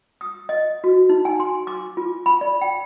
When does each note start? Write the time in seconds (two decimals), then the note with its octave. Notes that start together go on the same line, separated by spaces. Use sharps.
0.21 D#6
0.49 D#5
0.84 F#4
1.09 D#4
1.25 G#5
1.40 C6
1.67 D6
1.97 F4
2.26 B5
2.41 D5
2.61 G5